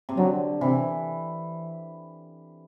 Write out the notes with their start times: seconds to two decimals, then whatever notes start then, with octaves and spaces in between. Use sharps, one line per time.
0.09 C3
0.17 D3 F#3
0.61 C3 E3